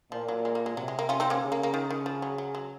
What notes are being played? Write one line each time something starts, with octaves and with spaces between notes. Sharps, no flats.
A#2 F3
F#3
G#3
A#3
G#3
C3 F#3
G#3
A#3
C#4 F4
C4 D#4
A#3 C#4
C#3
A#3
A#3
D#3
D#3
F3
F#3
F#3
F#3